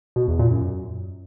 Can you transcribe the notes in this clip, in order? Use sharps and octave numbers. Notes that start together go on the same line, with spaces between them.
B2
E2
A#2
F#2